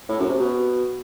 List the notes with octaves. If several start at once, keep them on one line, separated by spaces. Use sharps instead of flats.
A2
F#2
C3
B2